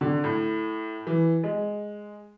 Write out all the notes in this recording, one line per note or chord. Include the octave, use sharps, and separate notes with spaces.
D3
A2
E3
G#3